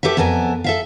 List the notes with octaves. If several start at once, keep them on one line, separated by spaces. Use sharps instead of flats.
G4 A4 B4 E5
F2 B3 A4 A#4 G#5
A4 E5 F5